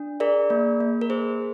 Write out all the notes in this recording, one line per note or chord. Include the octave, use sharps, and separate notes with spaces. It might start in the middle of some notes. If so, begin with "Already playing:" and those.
Already playing: D4
G#4 A#4 D5
A#3
A#3
A#4
G#4 C5